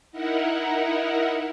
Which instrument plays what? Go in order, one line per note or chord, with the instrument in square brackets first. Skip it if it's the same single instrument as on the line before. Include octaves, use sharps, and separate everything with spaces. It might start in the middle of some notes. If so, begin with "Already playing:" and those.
[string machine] D#4 E4 A#4 F#5